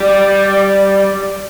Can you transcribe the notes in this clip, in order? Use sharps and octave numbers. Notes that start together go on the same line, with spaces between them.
G3 D5